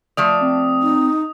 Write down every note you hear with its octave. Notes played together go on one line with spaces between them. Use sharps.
F3 A3 D5 D#6
C4
D#4